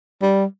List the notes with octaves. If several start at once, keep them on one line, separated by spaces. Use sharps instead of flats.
G3